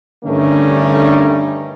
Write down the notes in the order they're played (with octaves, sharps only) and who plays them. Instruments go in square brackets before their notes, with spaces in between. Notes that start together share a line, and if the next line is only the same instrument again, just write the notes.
[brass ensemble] G2 D3 D#3 G3 A3 C#4